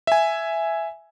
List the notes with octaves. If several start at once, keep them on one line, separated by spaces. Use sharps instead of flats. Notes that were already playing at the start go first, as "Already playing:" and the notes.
E5 G#5